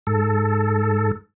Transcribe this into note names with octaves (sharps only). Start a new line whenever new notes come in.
G#2 A4